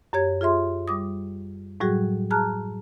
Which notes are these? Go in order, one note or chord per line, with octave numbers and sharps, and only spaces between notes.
F#2 G4 C#5 G#6
F4 G#4 E5 C6
G3 D6 D#6
A2 F#3 G3 F#4 G#4
G#4 A5 A#5 F6 F#6